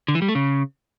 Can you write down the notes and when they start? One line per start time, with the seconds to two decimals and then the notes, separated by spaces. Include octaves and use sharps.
0.08 D3
0.15 E3
0.22 G3
0.28 A3
0.35 C#3